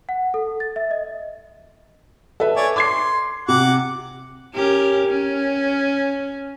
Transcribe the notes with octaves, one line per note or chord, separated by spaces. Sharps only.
F#5
A4
A6
E5
D#5
A4 B4 E5
C#5 D5 G#5
C6 D6 G#6 C7
C3 F#5 D6
C#4 G4 A#4
C#4